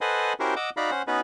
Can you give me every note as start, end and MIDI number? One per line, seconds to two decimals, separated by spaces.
0.01 0.33 69
0.01 0.33 71
0.01 0.33 72
0.01 0.33 75
0.01 0.33 78
0.01 0.33 80
0.40 0.54 61
0.40 0.54 64
0.40 0.54 66
0.40 0.54 67
0.40 0.54 70
0.40 0.54 72
0.56 0.70 75
0.56 0.70 78
0.56 0.70 86
0.56 0.70 88
0.77 0.91 63
0.77 0.91 66
0.77 0.91 74
0.77 0.91 77
0.77 0.91 82
0.77 0.91 83
0.91 1.02 61
0.91 1.02 72
0.91 1.02 78
1.07 1.21 59
1.07 1.21 61
1.07 1.21 63
1.07 1.21 66
1.07 1.21 71